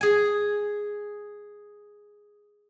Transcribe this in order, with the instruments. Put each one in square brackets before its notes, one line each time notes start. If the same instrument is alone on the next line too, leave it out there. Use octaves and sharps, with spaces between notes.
[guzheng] G#4 G#5